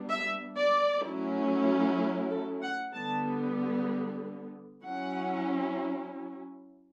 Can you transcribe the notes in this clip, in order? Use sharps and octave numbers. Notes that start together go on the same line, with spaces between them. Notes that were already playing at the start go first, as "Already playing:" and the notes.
Already playing: G3 B3 D4
E5
D5
F#3 A3 C#4 E4
A4
F#5
D3 G3 B3 A5
F#3 C#4 E4 F#5